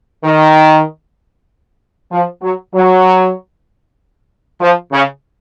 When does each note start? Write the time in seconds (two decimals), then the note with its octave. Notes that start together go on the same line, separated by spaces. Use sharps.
0.24 D#3
2.11 F3
2.42 F#3
2.74 F#3
4.60 F3
4.91 C#3